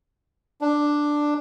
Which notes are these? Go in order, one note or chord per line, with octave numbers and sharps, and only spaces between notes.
D4